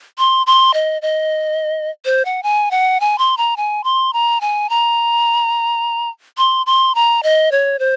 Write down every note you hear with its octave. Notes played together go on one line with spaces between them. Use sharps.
C6
C6
D#5
D#5
C5
F#5
G#5
F#5
G#5
C6
A#5
G#5
C6
A#5
G#5
A#5
C6
C6
A#5
D#5
C#5
C5